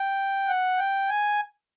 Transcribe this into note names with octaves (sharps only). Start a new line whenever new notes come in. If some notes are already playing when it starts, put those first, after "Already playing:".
Already playing: G5
F#5
G5
G#5